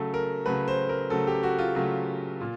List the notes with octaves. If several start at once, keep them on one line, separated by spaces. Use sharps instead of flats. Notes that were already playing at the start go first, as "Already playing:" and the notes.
Already playing: C#3 F#3 A3 A4
A#4
C#3 F#3 A3 B4
C5
A#4
C#3 F#3 A3 A4
G4
F#4
F4
C#3 F#3 A3
A#2